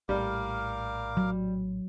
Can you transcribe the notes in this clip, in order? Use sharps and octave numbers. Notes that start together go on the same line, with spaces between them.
A#1 A2 G3 A#4 F5 D6
F#3